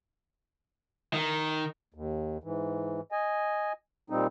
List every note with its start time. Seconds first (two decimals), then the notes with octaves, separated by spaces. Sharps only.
1.14 D#3
1.94 D#2
2.44 G#2 E3
3.12 D#5 G#5
4.10 A#2 G3 C4 D#4